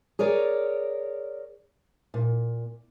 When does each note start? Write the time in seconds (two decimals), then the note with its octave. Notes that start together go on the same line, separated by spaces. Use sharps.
0.19 G#4 A#4 C#5 D5
2.14 A#2